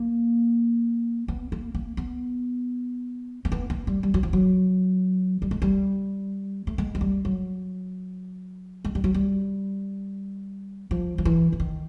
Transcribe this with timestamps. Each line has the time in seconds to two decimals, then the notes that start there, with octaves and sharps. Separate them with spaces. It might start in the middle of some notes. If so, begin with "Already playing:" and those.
Already playing: A#3
1.28 B3
1.52 A#3
1.75 A#3
1.97 B3
3.45 A#3
3.52 B3
3.70 A#3
3.87 G3
4.03 G3
4.14 F#3
4.23 F3
4.33 F#3
5.42 G3
5.51 G#3
5.62 G3
6.67 A3
6.78 G#3
6.95 F#3
7.01 G3
7.25 F#3
8.85 G#3
8.95 G3
9.04 F#3
9.14 G3
10.91 F3
11.18 F3
11.25 E3
11.52 E3
11.60 D#3